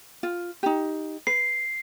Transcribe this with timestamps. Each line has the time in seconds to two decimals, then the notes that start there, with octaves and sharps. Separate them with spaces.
0.23 F4
0.63 D#4 G4
1.27 B4 C7